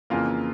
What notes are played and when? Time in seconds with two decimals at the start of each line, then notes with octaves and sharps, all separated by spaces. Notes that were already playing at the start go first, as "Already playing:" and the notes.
0.10 F2 C#3 E3 A#3 F4